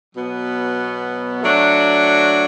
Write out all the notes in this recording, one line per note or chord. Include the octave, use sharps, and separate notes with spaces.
B2 F#3 B3
F#3 A3 D4 F#4